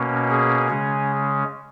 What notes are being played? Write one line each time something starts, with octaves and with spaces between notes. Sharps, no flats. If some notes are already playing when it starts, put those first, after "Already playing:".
Already playing: B2 A#3 C#4
G#4
C#3 G#3 C#4